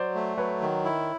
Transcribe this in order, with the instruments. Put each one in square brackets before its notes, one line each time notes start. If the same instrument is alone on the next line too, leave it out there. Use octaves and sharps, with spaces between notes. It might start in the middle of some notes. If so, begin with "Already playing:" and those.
Already playing: [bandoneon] F#3 [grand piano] C5 D5
[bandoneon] A3
[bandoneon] F#3 [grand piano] B4 C#5
[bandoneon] D#3
E4